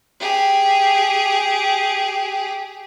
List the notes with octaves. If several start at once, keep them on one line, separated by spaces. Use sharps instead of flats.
G4 G#4